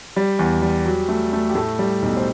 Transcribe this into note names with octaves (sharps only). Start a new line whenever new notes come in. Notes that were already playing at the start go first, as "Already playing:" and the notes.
G3
E2
G3
F#3
A3
A3
G4
A2 A4
G3
B1
C5